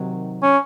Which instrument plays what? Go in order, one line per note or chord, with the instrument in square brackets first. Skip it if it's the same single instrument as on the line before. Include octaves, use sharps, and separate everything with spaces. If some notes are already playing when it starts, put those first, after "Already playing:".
Already playing: [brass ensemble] C3 D#3 F#3
[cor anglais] C#4